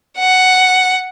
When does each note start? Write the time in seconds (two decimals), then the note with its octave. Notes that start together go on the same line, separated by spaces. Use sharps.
0.18 F#5